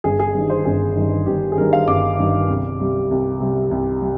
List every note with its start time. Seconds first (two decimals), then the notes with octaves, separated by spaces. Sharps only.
0.04 G1 G#4
0.19 G#4
0.35 G2 D#3
0.50 C5
0.65 G1 G#4
0.96 G2 D#3
1.26 G1 G4
1.52 G#4
1.57 G2 D#3 A#4
1.73 F5
1.87 G1 D6
2.19 G2 D#3
2.50 C2
2.80 C3 G3
3.11 C2
3.40 C3 G3
3.71 C2
4.02 G3